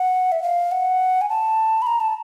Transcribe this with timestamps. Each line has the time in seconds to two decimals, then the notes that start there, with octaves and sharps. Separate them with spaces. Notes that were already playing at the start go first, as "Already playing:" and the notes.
Already playing: F#5
0.32 E5
0.43 F5
0.72 F#5
1.21 G#5
1.29 A5
1.82 B5
1.87 A#5
2.00 A5